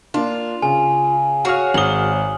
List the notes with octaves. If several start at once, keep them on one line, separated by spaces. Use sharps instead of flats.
A#3 D4 F4
C#3 G#5
F#4 G#4 C#5 F5 C#6 F6
G#1 D#6 F#7 G7